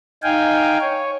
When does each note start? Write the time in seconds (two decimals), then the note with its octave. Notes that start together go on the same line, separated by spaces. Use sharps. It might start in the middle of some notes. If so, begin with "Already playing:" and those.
0.23 D#4 F5 G5 G#5
0.81 C#5